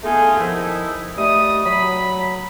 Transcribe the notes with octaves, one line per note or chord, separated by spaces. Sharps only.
A3 B3 D#4 F4 G#4
D#3 F3 D#4 E4
G3 A3 D#5 D#6
F#3 B5